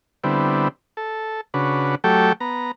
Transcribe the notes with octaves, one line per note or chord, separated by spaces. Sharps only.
D3 G3 B3 C4 E4
A4
C#3 D4 F#4 B4
F#3 A3 G4 A4 G5
B3 A#5